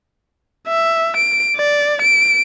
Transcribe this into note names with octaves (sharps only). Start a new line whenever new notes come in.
E5
D7
D5
D7